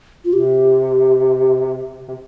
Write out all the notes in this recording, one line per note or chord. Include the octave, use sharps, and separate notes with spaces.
F4
C3 G4
C3